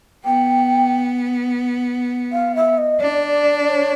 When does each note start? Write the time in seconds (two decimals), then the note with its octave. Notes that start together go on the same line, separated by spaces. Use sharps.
0.25 B3 G5
2.32 F5
2.55 E5
2.78 D#5
3.00 D4 D5
3.69 C#5